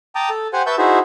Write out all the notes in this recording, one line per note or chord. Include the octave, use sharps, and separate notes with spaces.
G5 A5 A#5 D6 D#6
A4
G4 C5 F#5 G#5
B4 E5 A5 C#6 E6 G6
D#4 E4 F#4 G#4 C5 E5